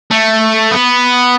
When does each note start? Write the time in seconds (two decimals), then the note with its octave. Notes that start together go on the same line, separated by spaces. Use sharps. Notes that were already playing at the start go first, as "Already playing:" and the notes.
0.11 A3
0.71 B3